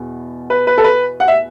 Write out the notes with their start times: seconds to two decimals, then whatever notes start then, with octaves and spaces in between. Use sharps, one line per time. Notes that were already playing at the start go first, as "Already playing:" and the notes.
Already playing: E2 B2
0.50 B4
0.67 B4
0.78 A4
0.84 B4
1.20 F#5
1.28 E5